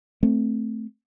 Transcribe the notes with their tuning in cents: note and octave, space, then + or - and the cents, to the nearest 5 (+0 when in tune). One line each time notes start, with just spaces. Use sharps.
A3 +5 C4 +0